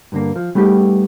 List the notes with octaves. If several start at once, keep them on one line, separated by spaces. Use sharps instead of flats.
G2 D3 A#3
F3
G3 A3 B3 D#4 G4